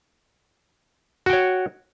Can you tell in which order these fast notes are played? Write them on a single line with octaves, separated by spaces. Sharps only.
F#4 G5 C#5